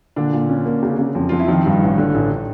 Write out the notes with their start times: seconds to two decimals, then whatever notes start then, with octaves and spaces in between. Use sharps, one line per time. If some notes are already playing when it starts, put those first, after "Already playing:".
0.16 A#2 D3 D4
0.33 A#2
0.49 C#4
0.66 A#3
0.83 C#3
0.99 C#3
1.15 F2
1.29 F2 F4
1.39 E4
1.48 D#3 F3 D#4
1.66 G2
1.82 A1
1.98 D3
2.14 A1